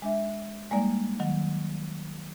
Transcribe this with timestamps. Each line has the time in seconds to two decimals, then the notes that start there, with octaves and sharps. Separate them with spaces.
0.02 G#3 D4 E5
0.71 G3 G#3 A#3 D#4 D5
1.20 D#3 F#3